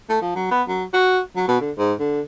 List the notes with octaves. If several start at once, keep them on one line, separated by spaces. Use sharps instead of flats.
A3
F3
F#3
B3
F#3
F#4
F#3
B2
D3
G#2
D3